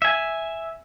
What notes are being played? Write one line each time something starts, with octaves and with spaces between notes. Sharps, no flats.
E5 G#5